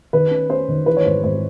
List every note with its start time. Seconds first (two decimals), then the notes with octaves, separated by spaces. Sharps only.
0.13 D#3 B4
0.31 C#4
0.50 C#4 C5
0.68 D#3
0.86 E3 B4
0.97 C#5
1.05 G#1 C5
1.24 G#1 C5